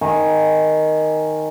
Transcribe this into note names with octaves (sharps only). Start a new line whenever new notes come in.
D#3 G#5